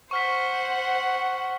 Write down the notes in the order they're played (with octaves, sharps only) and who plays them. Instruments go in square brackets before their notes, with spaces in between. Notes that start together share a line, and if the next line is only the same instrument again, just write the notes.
[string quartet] C5 F#5 [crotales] C#6 F6 B6